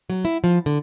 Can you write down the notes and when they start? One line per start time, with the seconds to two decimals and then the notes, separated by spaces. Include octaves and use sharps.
0.10 F#3
0.25 E4
0.44 F3
0.66 D3